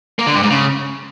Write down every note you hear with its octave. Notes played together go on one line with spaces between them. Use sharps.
A#3
D3
G2
G#2
C#3